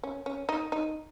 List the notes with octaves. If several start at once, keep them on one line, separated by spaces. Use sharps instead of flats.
C#4
C#4
D#4
D#4